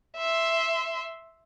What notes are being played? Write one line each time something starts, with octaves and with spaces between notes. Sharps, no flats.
E5 C6